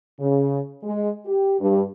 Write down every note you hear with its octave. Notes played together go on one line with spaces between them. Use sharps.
C#3
G#3
G4
G2